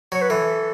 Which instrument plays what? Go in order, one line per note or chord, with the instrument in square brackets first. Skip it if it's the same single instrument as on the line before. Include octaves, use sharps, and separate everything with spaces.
[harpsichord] F#3 [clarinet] C#5
[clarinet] B4
[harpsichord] E3 [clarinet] A4